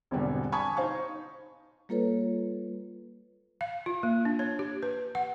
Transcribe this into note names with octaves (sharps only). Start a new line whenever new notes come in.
G#1 E2 B2 D3 G3
G#5 A5 B5 C#6 D#6 G#6
D#4 C5 F5 C#6
G3 A#3 F4 A4 B4 C#5
F5
F4
A#3
D4
C#5
G4
B4
F#5